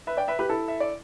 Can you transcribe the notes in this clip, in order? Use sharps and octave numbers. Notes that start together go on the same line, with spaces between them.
B4 E5
D5 G5
B4 E5
G4 B4
E4 A4
E5
D5